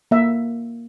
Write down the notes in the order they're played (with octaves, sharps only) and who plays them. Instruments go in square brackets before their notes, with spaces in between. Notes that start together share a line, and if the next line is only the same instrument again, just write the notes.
[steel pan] A#3 E5